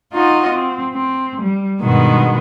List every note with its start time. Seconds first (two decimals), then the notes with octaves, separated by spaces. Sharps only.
0.13 D#4 F4 F#4 D#5
0.49 C4
0.94 C4
1.41 G3
1.81 G2 B2 D#3 G#3 B3 F#4